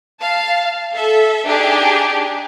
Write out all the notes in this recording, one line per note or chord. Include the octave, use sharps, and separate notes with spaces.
F5 A5
A4 E5
D4 D#4 G4 G#4